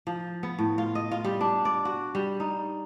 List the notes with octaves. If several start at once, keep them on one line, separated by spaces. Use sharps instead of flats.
F3
B3
A2
F4
D#5
F4
G3
D4
D5
F#4
G3
D#4